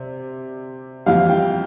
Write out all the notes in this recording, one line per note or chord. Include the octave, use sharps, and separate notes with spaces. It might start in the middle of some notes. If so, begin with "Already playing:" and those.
Already playing: C3 D5
F2 E3 G3 F5
G5